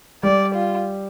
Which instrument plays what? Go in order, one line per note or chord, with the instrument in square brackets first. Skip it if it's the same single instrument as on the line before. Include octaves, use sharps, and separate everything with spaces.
[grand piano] G3 [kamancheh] D5
[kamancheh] F4